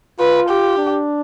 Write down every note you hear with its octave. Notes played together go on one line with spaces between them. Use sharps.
F4 B4
G4
D4